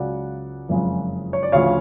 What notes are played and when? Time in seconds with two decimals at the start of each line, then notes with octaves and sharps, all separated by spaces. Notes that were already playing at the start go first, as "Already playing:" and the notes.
Already playing: C#2 C#3 F#3 D5 F#5
0.69 F#1 F2 C#3 G#3
1.33 C#5
1.43 D5
1.52 D2 C#3 F3 C#5 F5